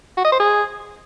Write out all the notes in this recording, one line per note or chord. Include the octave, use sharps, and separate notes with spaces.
F#4
D#5
C5
G#4